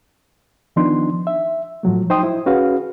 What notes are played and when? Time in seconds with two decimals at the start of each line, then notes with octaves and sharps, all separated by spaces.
0.76 D#3 F3 B3 D4 D#4 C6
1.27 E5
1.83 A2 F3 F#3 A3
2.10 D#4 C5 G5 C6 D#6
2.23 E4
2.46 C#4 F#4 G#4 B4 F5